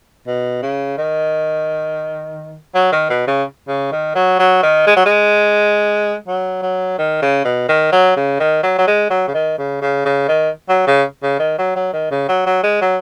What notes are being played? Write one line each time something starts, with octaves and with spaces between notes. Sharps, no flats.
B2
C#3
D#3
F#3
D#3
B2
C#3
C#3
D#3
F#3
F#3
D#3
G#3
F#3
G#3
F#3
F#3
D#3
C#3
B2
D#3
F#3
C#3
D#3
F#3
F#3
G#3
F#3
C#3
D#3
C#3
C#3
C#3
D#3
F#3
C#3
C#3
D#3
F#3
F#3
D#3
C#3
F#3
F#3
G#3
F#3